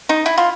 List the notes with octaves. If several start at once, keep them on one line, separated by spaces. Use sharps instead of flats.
D#4
E4
F4